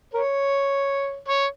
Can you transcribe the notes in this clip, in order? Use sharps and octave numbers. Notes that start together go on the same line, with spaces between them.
A#4 C#5
C#5